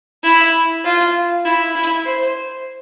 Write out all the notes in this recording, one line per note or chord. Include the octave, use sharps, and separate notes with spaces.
E4
F4
E4
E4
C5